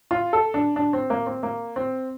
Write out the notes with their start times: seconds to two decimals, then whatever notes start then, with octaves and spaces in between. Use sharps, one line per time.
0.11 F4
0.33 A4
0.54 D4
0.76 D4
0.93 C4
1.10 A#3
1.26 C4
1.43 A#3
1.76 C4